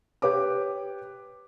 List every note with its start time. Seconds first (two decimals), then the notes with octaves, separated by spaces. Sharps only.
0.22 G4 B4 C#5 D6